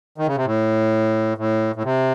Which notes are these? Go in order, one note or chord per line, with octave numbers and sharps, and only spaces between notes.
D#3
C#3
C3
A2
A2
A2
C3